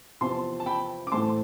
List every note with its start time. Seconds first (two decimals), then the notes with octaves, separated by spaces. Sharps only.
0.21 E2 C3 F3 C4 A5 C6
0.60 A5
0.66 G5 B5
1.07 D6
1.12 A2 E3 A3 C4 A5 C6